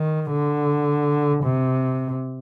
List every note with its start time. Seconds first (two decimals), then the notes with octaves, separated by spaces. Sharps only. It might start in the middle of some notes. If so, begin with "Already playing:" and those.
Already playing: D#3
0.31 D3
1.44 C3